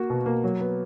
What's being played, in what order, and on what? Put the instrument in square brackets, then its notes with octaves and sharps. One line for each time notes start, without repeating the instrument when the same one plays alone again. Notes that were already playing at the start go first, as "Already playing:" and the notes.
Already playing: [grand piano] A#3 F#4
B2
A#3
F#3
B3